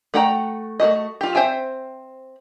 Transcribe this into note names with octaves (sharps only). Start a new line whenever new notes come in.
A3 F#4 F#5 G5 A#5
A3 A#3 F#4 D#5
F4 G4
C4 C5 E5 G5 G#5